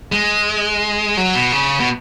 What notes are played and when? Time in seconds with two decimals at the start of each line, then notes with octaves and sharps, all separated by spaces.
0.12 G#3
1.17 F#3
1.35 B2
1.52 C#3
1.80 B2